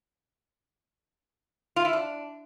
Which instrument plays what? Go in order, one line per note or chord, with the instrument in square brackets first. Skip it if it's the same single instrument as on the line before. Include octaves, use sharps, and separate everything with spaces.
[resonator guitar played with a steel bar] F4
E4
D4